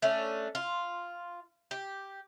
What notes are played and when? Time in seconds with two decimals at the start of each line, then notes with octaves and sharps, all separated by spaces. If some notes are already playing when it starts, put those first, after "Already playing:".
0.02 A3 C#4 D4
0.55 F4
1.71 G4